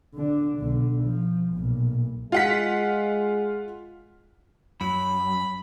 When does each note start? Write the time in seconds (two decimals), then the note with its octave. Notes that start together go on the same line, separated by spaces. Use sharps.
0.14 D3 D4
0.59 B1 D3
1.04 F3
1.53 B1 A#2
2.32 G#3 F4 F#5 B6
4.81 F#2 B5